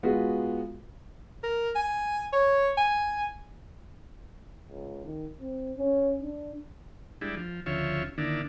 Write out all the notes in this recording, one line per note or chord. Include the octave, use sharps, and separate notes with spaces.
G#3 B3 F4 F#4 G#4
A#4
G#5
C#5
G#5
C#2
D#3
C4
C#4
D4
G3 G#3 D4 E4
F3
D2 C#3 F3 F4 C#5 E5
D3 D#3 A#3 D4 E4